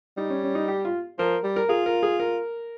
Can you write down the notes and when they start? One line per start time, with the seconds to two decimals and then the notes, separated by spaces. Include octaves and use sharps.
0.17 G3 D#4
0.30 C#4
0.43 C#4
0.55 D#4
0.68 G4
0.85 F4
1.19 F3 A#4
1.44 G3
1.56 A#4
1.69 F4 G#4
1.86 A#4
2.03 G#4
2.20 A#4